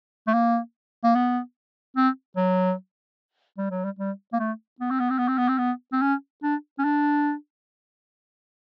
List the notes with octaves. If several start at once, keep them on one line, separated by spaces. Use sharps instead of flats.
A3
A#3
A#3
B3
C4
F#3
G3
F#3
G3
G3
A#3
A3
B3
C4
B3
C4
B3
C4
B3
C4
B3
C4
C#4
D4
C#4
D4